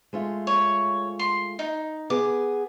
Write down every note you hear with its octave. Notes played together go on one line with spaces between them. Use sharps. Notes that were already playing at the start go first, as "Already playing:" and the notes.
G#3 A3 F4
C#5
C6
D#4
B3 G#4 D6